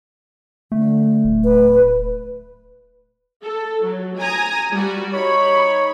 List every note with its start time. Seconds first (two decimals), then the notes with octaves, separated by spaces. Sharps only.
0.72 D3 A3
1.24 D1
1.44 B4
3.43 A4
3.83 F#3
4.18 G#5 A#5 D#6
4.71 G3 F#4
5.13 D#4 C#5 B5